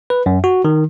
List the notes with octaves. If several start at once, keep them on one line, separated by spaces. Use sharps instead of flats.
B4
F#2
F#4
D#3